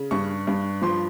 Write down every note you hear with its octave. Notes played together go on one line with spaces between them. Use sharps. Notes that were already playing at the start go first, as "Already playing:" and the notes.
Already playing: C#3
G2 C#6
G2
F3 C6